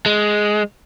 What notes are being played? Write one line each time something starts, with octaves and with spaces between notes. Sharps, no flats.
G#3